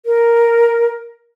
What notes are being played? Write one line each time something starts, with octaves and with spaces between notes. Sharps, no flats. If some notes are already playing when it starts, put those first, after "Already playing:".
A#4